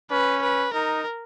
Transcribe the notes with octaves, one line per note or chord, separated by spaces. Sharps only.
C#4 B4
B4
D#4 A#4